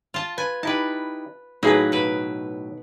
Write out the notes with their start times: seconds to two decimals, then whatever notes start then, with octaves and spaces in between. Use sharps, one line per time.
0.14 F4 A5
0.38 B4 G#5
0.63 D#4 E4 G4 B4 A5
1.63 A2 E3 F#3 A#3 D#4 G#4 B4
1.92 B2 B4